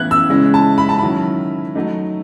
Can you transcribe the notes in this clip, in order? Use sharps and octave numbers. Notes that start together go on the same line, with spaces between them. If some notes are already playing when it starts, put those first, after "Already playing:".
Already playing: A2 E3 B3 E4 F#6 G#6
E6
C#3 G#3 C#4 E4
A5
B5
A5
D#3 F#3 C#4 E4 B5
F#3 A3 D#4